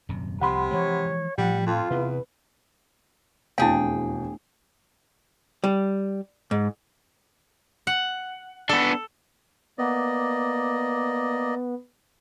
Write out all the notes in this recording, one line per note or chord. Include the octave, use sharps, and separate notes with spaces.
D#1 F#2 C3
C2 C3 F3 F#5 B5 C6
E3 F3 G#3 C#5
A2 F3 G3 F#5
F2 F4
E2 C3 B4
E1 F2 A3 D4 E4 G#4 F5 G5
G3
G#2
F#5
B3 D4 A4
A#3 B3 D5 D#5